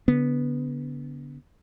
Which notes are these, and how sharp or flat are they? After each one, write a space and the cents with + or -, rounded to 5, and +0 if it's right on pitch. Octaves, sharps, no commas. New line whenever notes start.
D3 -30 B3 -10